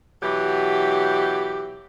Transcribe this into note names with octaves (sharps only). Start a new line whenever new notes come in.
B2 E3 F#3 G4